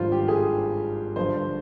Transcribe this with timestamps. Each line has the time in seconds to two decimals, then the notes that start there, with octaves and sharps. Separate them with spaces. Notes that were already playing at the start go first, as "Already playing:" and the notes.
Already playing: G#1 G2 F3 F4 C5
0.12 G4
0.28 G#4
1.16 G1 G2 F3 C5